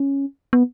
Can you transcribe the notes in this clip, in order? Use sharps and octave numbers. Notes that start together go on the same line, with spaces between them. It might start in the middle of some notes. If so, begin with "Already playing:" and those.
Already playing: C#4
B3